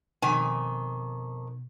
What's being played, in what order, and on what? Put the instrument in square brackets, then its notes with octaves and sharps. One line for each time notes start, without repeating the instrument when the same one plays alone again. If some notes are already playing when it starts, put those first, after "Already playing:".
[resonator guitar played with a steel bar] F2 D#3 G#5 [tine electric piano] B2